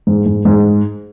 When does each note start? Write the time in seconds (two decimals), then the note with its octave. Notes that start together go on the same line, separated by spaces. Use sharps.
0.07 G#2
0.26 G#2
0.45 G#2